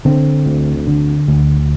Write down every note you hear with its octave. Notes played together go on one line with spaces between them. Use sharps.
D3 C4
D2
D3
D2